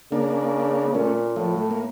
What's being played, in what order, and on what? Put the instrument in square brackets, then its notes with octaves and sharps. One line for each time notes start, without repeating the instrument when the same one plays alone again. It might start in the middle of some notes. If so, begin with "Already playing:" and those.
[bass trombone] C#3 [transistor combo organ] A#3 D4
[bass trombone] A#2 [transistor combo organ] A3 C#4
[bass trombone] A2 [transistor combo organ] F3
[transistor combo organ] A3
A#3